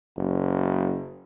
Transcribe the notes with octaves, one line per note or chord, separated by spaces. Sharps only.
F#1